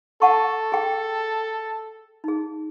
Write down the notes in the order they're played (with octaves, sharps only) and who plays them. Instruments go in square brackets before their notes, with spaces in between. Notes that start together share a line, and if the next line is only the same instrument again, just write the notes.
[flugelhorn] A4 [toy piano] F#5 A5 C#6
[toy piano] G#4 G5
D#4 G#4